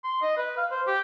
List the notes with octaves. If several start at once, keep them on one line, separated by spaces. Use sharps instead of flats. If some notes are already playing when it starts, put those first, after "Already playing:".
C6
D#5
B4
F5
C5
G4